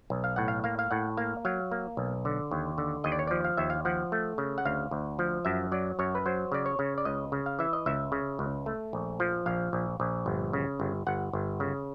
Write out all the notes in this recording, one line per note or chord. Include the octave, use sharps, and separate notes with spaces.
B1
F5
A2 F#5
F5
A#3 F5
F5
A2 F#5
A#3 F5
F#3 F5
A#3
B1
D3
D#2
D3
D#2 D#5
D5
C#5
F3 D5
F5
D#2 E5
F5
F3 F#5
A3
C#3
F#5
D2 F5
D2
F3
F#2 E5
F#3 D5
F#2 C#5
B4
F#3 C5
C#3 D5
C#5
C#3
D5
C#2 D#5
C#3
F5
E3 E5
D#5
C#2 E5
C#3
C#2
A3
A#1
F3
A#1 F5
A#1
A#1
G1
C#3
G1
G1 F#5
G1
C#3